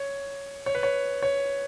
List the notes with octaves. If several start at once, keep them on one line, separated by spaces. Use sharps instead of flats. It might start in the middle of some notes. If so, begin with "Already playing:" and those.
Already playing: C#5
C#5
B4
C#5
C#5